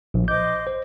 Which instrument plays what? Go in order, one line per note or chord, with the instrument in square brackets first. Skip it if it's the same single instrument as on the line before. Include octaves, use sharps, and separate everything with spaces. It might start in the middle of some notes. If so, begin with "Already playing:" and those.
[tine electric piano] A#1
[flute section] C5 D#5 D6 [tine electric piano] G6
[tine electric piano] C5